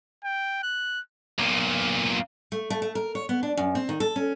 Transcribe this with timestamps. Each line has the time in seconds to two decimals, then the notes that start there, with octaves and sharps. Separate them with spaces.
0.24 G5
0.63 F#6
1.39 B1 A#2
2.52 A3
2.70 A3
2.82 A3
2.95 A#4
3.15 C#5
3.29 B3
3.43 D4
3.57 F#2
3.75 C4
3.89 D#3
4.00 A4
4.16 C#4